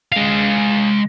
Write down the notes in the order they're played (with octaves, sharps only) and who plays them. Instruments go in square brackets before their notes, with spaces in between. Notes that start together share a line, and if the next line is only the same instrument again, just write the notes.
[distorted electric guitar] G#3 F5